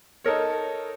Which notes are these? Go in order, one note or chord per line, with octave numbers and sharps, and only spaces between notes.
D#4 A4 A#4 C#5